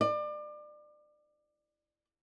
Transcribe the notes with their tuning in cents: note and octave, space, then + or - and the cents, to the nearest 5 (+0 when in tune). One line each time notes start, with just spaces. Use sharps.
D5 +30